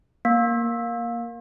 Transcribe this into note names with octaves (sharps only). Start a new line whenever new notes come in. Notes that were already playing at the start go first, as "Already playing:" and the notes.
A#3